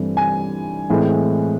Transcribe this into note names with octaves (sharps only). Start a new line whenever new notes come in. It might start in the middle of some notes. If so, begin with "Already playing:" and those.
Already playing: G2 E3 A3 C4
G#5
A2 E3 G#3 C4